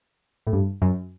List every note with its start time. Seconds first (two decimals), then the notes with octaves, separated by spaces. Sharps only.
0.47 A2
0.53 G2
0.82 F#2